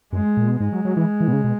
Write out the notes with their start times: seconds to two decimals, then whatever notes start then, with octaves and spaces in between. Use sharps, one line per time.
0.13 F#2 G#3
0.37 A#2
0.48 B2
0.60 G#2 G#3
0.72 F#3
0.85 F#3
0.97 E3
1.20 E3
1.28 B2
1.33 C#3
1.44 B2